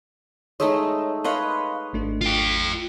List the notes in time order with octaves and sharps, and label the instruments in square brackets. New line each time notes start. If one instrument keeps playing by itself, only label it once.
[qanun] G#3 A3 D#4 [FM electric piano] C#5 D#6 E6
[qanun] B4 C#5 D#5 [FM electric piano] F5 C6 D#6
[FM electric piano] G#1 A3 D4
[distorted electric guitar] F4 G5